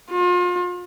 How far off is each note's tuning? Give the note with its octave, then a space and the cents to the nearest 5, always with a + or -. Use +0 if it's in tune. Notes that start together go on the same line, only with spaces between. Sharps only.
F4 +35